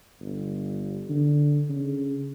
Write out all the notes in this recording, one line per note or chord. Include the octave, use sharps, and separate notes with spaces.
G1
D3
C#3